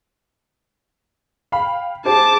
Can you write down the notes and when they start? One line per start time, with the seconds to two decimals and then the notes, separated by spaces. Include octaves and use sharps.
1.52 F5 G5 B5
2.06 G4 G#4 C5 A5 D6